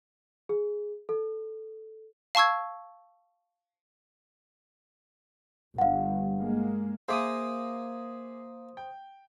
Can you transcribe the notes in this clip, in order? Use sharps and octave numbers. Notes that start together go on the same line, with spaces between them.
G#4
A4
F5 A5 C#6 E6 G#6
G1 G2 F5 F#5
G#3 A#3
A#3 G#4 C5 E5 D6 D#6
G5